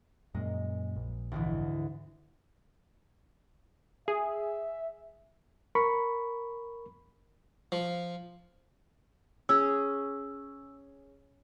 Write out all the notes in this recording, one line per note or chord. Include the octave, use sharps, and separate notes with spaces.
F#2 A#2 G#3
A#1
D2 G#2 E3
G#4 E5
A#4 B5 C#6
F3
C#4 G#4 E6